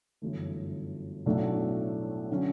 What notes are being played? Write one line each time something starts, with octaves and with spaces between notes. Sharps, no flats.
G1 F#2 E3 A3
B1 A2 F#3 A3 D4
D3 F#3 C#4